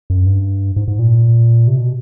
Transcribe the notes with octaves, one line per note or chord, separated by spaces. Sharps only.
F#2
G2
G#2
G#2
A#2
C3
B2